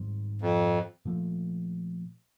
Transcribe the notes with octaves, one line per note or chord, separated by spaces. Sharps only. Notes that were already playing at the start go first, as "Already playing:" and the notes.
Already playing: G#2 D#3 G3 C4
F2
A#2 F3 A3